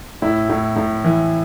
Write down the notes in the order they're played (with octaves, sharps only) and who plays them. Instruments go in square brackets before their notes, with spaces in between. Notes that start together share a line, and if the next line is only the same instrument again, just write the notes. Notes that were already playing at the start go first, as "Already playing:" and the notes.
[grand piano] A2 E4
A2
A2
E3